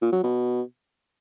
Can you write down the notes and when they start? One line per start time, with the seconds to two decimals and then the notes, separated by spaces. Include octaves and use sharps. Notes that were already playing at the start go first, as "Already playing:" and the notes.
0.01 A#2
0.12 F#3
0.24 B2